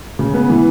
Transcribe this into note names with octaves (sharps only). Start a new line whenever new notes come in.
C#3
B3
E3